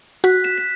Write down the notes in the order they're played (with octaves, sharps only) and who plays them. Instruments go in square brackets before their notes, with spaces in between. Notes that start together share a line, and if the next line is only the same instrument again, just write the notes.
[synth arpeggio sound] F#4 [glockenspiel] F#6 B6
[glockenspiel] B6 E7
B6